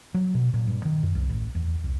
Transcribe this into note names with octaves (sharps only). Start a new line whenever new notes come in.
F#3
B2
A#2
G2
D#3
F#2
C2
A1
E2
C2